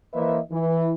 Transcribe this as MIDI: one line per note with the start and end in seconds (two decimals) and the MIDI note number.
0.14 0.38 52
0.14 0.38 58
0.14 0.38 71
0.14 0.38 72
0.14 0.38 75
0.14 0.38 76
0.52 0.93 52